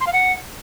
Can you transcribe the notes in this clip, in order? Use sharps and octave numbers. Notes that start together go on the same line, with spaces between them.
C6
F5
F#5